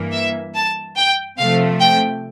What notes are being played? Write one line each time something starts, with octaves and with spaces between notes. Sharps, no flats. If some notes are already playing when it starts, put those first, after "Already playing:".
Already playing: G2 E3 A#3
E5
A5
G5
C3 F3 A3 F5
G5